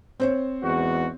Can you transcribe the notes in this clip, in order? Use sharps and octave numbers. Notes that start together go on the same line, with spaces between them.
C4 C5 C#5
E2 G#2 F#4